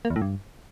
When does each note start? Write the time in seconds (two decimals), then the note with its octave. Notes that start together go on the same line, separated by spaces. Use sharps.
0.05 A#3
0.10 E2
0.16 A2
0.22 G2